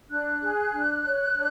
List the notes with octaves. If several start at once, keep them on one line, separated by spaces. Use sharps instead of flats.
D4 F#6
G#4
D4
C#5
D4